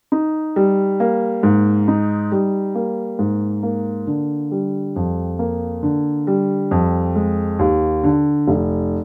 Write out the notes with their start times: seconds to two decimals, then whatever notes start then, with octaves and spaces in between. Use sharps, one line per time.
0.12 D#4
0.56 G3
1.00 A#3
1.43 G#2
1.88 D#4
2.32 G3
2.75 A#3
3.19 G#2
3.63 A#3
4.07 D3
4.51 G3
4.96 F2
5.39 A#3
5.83 D3
6.27 G3
6.71 F2
7.16 G#3
7.59 D#2
8.04 D3
8.48 F1